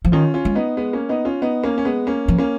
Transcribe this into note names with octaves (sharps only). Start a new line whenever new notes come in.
F3
D#3 C#4 F4
C#4 F4
G#3
B3 D#4
G#3 B3
A#3 C#4
B3 D#4
C#4 F4
B3 D#4
A#3 C#4
C#4
G#3 B3
A#3 C#4
F3
A#3 C#4